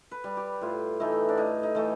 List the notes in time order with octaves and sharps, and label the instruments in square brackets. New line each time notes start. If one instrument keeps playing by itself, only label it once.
[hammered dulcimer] B4
G3
G4
A2 F4
E3 A3 D#4
D4
A2 D#4
D#4
E3 A3